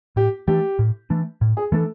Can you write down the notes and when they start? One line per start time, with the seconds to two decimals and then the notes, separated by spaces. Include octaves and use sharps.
0.16 A2 G4
0.47 E3 A3 D4 G4
0.79 A2
1.10 E3 A3 D4
1.41 A2
1.57 G#4
1.72 E3 A3 D4 A4